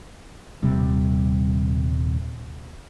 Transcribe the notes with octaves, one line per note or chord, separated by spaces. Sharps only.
D#1 C3 G3